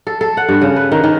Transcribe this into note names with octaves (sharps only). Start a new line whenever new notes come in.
A4
A4
F#5
G2
C#3
B4
D#3
D#3